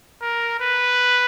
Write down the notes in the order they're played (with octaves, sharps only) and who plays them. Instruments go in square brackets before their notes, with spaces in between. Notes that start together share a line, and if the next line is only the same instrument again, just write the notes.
[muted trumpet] A#4
B4